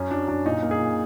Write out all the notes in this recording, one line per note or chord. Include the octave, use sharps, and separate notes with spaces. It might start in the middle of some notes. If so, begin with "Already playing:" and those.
Already playing: F#2 C#4
F#3 D4
F#2 D4
A#2 D#4
A#3
G#4
A#2